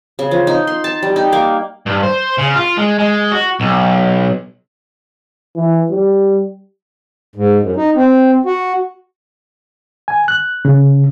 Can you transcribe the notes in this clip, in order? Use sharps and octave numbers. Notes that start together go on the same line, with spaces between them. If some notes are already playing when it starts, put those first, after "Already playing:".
C#3
F3
D#4
C6
A5
G3
D#4
A#3
G2
C5
C#3
F4
G#3
G#3
F#4
B1
E3
G3
G#2
F#2
D#4
C4
F#4
G#5
F#6
C#3